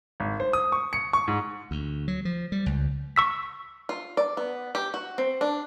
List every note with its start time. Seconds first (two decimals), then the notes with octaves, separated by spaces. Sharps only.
0.20 G#1
0.40 C5
0.53 D#6
0.72 C#6
0.93 C#7
1.13 C#6
1.28 G#2
1.71 D2
2.08 F#3
2.25 F3
2.52 G3
2.66 C#2
3.16 C#6 E6 B6
3.89 F4
4.17 D5
4.37 B3
4.75 G4
4.94 F#4
5.18 C4
5.41 D4